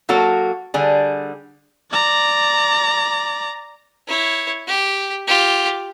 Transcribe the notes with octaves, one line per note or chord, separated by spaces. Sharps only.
F#3 A#3 F#4 A4
D3 G3 G#4
D5 A#5
E4 C#5
G4
F4 G4